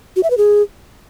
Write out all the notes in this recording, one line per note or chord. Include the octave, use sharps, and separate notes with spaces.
F#4
E5
B4
G#4